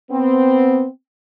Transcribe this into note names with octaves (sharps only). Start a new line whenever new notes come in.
B3 C4